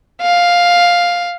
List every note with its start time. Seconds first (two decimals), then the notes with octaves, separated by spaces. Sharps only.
0.22 F5